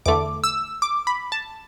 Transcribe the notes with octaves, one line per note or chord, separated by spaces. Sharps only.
E2 D3 A3 D6
E6
D6
B5
A5